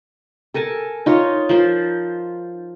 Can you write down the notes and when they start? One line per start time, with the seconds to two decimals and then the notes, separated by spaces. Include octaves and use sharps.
0.54 A4 A#4 G#5 A5
1.06 D#4 F4 C#5
1.49 F3 F4 A#4 C5